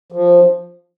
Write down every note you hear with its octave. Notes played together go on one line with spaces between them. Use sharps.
F3